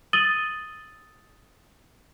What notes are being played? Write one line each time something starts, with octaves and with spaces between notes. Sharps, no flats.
D#6 E6 A6 D#7 F#7 G7